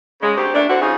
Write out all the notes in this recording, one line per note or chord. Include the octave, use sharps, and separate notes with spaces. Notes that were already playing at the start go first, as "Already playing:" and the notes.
C#3 G#3
D2 C4 G4
A#2 A3 D4
D3 C4 E4 F#4
C#3 F3 G3 D#4 G#4